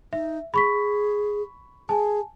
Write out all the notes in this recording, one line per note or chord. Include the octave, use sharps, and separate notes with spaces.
D#4 E5
G#4 B5 C#6 B6
G#4 G#5 A5